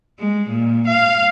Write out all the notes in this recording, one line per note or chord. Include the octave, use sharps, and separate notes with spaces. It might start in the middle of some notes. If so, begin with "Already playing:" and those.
G#3
A#2
F5